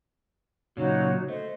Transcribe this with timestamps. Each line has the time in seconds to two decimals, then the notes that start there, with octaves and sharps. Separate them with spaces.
0.77 A#2 C#3 F#3 D#4 F#4 C#5
1.28 A3 C5 D#5